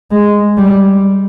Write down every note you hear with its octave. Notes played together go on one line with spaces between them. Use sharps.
G#3
G3